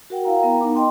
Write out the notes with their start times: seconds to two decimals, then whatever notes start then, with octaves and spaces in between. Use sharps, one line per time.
0.10 F#4 A#4 F#5 G5
0.25 E4 F5 G5 A#5
0.42 B3 A#4 A#5
0.61 B3 D#4 D6
0.75 D#5 G5 C6